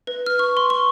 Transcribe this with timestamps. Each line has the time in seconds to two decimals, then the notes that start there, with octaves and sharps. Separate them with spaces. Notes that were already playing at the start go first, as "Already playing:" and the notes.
0.07 B4
0.26 F6
0.39 C#6
0.57 C6
0.70 C#6